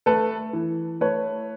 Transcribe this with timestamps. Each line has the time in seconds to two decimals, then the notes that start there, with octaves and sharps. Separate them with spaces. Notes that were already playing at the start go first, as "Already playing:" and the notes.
0.06 A3 A4 B4
0.53 E3
1.01 A3 B4 C#5